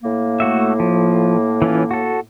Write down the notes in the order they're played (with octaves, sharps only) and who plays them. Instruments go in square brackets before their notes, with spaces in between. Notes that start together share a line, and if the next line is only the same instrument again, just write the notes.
[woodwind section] A2 A#3
[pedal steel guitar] A3 F#4 E5
F3
E3 C#4 F4
F#4 A4